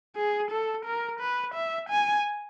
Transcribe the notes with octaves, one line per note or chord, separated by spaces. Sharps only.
G#4
A4
A#4
B4
E5
G#5